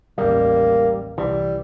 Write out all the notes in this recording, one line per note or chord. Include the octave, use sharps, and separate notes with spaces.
A1 D#2 G3 A#3
C2 E3 G3